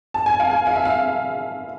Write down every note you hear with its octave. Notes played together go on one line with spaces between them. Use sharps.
A5
G#5
F5
G#5
F5
E5
F5